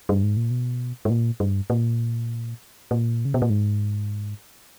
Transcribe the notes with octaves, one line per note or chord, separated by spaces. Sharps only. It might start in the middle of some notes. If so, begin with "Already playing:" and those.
G2
G#2
A#2
B2
G#2
A#2
G2
A#2
A#2
C#3
B2
A#2
G#2